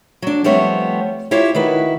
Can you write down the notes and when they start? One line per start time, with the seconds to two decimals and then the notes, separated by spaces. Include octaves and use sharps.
0.22 F#3 D4
0.44 F3 G3 A3 B3 C4 C#5
1.31 E4 F4 G4 C#5 F5
1.55 D#3 E4 F#4 B4